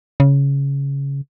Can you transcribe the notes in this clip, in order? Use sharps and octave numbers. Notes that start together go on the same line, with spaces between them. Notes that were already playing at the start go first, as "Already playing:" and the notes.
C#3